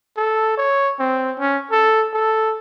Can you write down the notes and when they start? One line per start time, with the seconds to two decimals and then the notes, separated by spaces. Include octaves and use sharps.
0.17 A4
0.57 C#5
0.99 C4
1.39 C#4
1.71 A4
2.14 A4